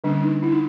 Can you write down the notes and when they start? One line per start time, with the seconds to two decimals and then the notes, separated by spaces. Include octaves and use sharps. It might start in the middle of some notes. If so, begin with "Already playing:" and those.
0.04 D3 G3 A#3 C#4 D4
0.23 D#4
0.43 E4
0.52 D#4